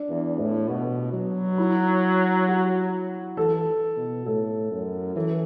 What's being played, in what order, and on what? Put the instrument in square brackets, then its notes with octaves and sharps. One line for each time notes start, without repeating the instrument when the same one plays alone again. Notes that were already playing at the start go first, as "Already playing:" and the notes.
Already playing: [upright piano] D4
[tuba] E2
A2
[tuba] B2 [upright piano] F#4
[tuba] F#3
[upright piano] E4
F#4
[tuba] E3 [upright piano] A4
[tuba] B2
[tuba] A2 [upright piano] A4
[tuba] F#2
[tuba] E3 [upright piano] A4